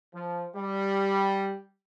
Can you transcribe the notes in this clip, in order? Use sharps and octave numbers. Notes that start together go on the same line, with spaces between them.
F3
G3